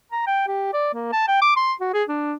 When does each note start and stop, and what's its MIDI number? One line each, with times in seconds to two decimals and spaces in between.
0.12 0.27 82
0.27 0.45 79
0.48 0.70 67
0.73 0.94 74
0.94 1.08 58
1.13 1.27 81
1.28 1.39 79
1.42 1.56 86
1.57 1.74 84
1.81 1.93 66
1.94 2.04 68
2.09 2.34 62